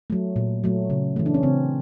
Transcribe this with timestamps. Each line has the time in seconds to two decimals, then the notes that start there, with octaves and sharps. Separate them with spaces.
0.10 F#3 A3
0.36 A#2
0.64 F#3 A3
0.90 C#3
1.16 E3 A3
1.26 D4
1.34 C#4
1.43 C#3 C4